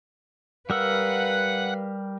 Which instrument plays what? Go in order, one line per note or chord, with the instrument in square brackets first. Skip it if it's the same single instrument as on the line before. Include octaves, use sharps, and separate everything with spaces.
[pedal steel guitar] G3 A#4 E6 [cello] B4 F5 [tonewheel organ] F#5